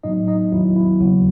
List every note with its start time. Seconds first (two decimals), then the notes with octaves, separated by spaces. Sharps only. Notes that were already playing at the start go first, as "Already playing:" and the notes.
0.03 A2 F#3 B3 D#4 D#5
0.27 D#4 D#5
0.52 E2 D#3 F#3 B3 E4
0.76 E4
1.00 D#2 C#3 F#3 F#4